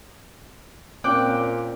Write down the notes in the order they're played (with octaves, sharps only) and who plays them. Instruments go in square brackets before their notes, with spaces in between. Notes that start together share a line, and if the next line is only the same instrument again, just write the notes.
[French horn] A#2 [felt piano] C4 C#4 C#5 [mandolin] G5 D6 F#6